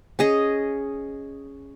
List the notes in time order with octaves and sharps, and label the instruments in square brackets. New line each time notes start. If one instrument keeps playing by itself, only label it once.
[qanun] C#4 G#4 D#5